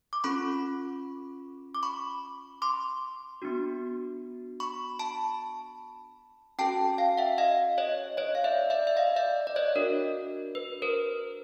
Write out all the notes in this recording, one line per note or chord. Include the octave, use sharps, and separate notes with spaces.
D6
C#4 F4 A4 B5 C#6
D6
B5 C#6
C6 D6
B3 D4 F#4
B5 C#6
A5 B5
C#4 F#4 A4 G5 A5
F5 G5
E5 F#5
D#5 F5
C#5 D#5
C#5 D#5
F5
D5 E5
D5 E5
E5
D#5 F5
D5 E5
D5
C#5 D#5
D4 F#4 A4 A#4
B4
A#4 C5